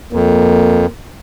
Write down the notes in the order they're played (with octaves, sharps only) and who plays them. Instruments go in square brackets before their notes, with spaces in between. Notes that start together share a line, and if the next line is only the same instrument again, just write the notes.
[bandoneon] F2 [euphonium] A#3